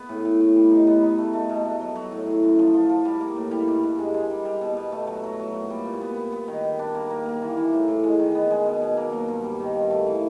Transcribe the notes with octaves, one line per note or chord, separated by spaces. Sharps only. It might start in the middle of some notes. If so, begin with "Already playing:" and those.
Already playing: B3
A2
A2
A2
G3
D#4
B3
D#4
A3
A3
B2
A3
F#3
F#3
A2
A2
F#2
F3
F3
F3
G3
A#3
A2
G3
G2
G2
G#3
G#3
G3
G3
B2
B2
A3
F#3
F#3
F#3
A#2
G3
A#2
B3
B3
B3
D#3
D#3
D4
A#3
A#3
A#3
E3
E3
A2
A2
G#3
D#3
B3
G#3
B2
B2
A#3
F#3
G2
G3
D#3
G2
A3
E3